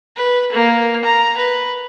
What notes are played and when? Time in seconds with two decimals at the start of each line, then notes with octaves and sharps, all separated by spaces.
0.16 B4
0.52 A#3
1.05 A#5
1.38 B4